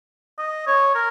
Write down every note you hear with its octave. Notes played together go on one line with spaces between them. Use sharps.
D#5
C#5
A#4